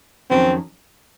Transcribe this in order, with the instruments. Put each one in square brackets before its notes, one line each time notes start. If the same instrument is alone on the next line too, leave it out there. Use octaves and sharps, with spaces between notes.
[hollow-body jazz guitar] F2 D#3 F#3 C#4 [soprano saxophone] C4